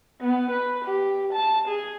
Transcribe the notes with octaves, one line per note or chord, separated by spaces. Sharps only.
B3
B4
G4
A5
G#4